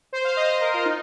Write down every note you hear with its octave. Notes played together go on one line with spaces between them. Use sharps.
C5
F5
D#5
C5
A#4
F4
D#4